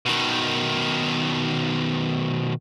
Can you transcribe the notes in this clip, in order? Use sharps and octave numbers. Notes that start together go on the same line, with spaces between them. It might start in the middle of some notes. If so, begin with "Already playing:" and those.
B2 D#3